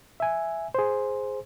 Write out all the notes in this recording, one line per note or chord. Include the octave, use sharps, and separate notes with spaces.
E5 G#5
G#4 C5